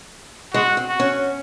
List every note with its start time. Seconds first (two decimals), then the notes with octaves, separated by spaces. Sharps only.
0.54 G#3 F#4
0.77 C4
0.88 F#4
1.00 C#4